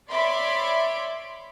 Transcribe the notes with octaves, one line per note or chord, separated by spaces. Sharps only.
C#5 D5 E5 B5 C6 D6